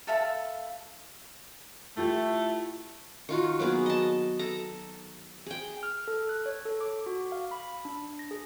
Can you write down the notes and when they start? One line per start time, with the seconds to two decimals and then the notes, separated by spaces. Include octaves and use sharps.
0.07 A4 E5 F5 B5
1.97 A3 E4 F4 G4
3.29 D#3 F4 F#4
3.59 F#3 A#3 B3 G#4
3.86 D#5 A5
4.39 A4 A#5
5.46 G#4 G5
5.83 F6
6.08 A4
6.29 F#6
6.46 C#5
6.65 A4
6.81 D6
7.06 F#4
7.32 F5
7.51 B5
7.85 D4
8.19 A#6
8.31 G#4